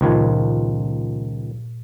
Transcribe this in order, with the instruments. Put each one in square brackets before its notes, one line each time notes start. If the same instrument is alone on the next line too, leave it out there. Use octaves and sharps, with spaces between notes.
[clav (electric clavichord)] C#2 D#3 F3 [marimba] G2 A#2 G#6